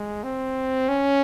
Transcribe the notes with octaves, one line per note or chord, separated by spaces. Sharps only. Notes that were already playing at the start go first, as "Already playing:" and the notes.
Already playing: G#3
C4
C#4